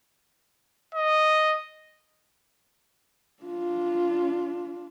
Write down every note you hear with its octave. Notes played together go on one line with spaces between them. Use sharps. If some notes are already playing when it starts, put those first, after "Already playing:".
D#5
D4 F4